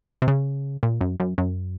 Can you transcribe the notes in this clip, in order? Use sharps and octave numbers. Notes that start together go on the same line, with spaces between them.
C3
C#3
A#2
F#2
F#2
F#2